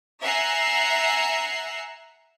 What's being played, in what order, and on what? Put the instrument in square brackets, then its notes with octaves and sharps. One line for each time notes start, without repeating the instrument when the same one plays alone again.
[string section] E5 F#5 G#5 A#5 E6 C7